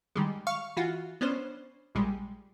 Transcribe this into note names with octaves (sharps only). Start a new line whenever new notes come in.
D#3 G3 G#3
F5 C#6
E3 F4 F#4
B3 C#4 D4 C5
A#1 G3 G#3